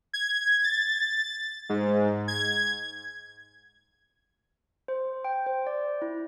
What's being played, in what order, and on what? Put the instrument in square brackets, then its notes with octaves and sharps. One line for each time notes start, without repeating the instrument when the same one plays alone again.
[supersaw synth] G#6
A6
G#2
G#6
[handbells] C5
G5
C5
D5
E4